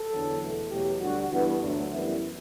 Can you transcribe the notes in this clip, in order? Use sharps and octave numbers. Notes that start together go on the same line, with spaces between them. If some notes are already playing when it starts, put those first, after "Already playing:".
Already playing: A4
E2 D3 F#3
E2 B2 A3
E2 B2 F#3 A3 G4
D2 D3 G3 F#4
G2 E3 B3 F#4
D2 D3 F#3 A3 D4
F#2 E3 G3 B3 E4